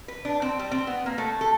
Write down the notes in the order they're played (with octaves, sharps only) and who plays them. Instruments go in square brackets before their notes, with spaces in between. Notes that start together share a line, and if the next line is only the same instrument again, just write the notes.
[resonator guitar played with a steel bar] B4
D4
C4
G3
C4
B3
A#3
A3
A4